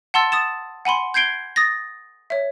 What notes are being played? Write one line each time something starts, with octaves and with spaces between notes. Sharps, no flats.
F#5 A5 C6 E6 A6
D#6 A6 E7
F#5 G#5 B5 C6
G6 G#6 C7 D7 G7
D#6 A6 A#6
C#5 E5